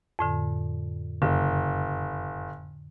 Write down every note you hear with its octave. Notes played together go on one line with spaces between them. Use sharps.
F2 A2 D3
F#1 D3